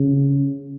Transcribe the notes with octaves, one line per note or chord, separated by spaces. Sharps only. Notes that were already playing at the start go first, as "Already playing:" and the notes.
Already playing: C#3